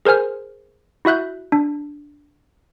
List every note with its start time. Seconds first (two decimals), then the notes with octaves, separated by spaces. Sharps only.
0.05 G#4 A#4 C5 G#5 F6
1.05 E4 F#4 E5 F#6 G6
1.52 D4